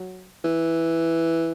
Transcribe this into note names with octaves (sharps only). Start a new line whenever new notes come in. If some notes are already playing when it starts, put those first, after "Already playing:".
Already playing: F#3
E3